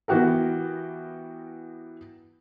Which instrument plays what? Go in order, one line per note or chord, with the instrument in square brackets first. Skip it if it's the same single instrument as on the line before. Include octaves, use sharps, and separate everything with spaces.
[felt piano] E3 B3 F#4 G4 A#4